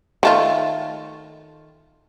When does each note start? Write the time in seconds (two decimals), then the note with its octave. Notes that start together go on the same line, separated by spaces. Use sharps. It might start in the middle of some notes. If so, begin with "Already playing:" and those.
0.23 D#3 A3 F4